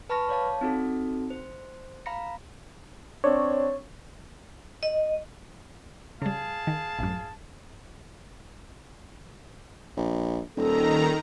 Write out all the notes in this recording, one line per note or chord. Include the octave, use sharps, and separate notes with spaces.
B4 A5 B5 C#6 F6 A#6
C#5 D5 F5 A5
C4 D#4 F#4 A4
C5
F5 A#5 B5 A#6 C#7
C4 D4 C#5
D#5
C#3 G3 G#4 F5 A5
D#3
A1 F#2
A#1
D#1 D#3 A4 A#5